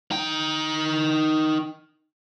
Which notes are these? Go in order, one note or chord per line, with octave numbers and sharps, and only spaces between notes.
D#4 G5